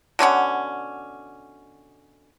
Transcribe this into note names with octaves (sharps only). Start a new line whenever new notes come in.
B2 D3 C#4 F#5